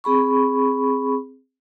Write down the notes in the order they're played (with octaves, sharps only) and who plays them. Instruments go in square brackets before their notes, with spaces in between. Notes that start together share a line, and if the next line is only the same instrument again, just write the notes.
[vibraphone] C4 G#4 B5 C#6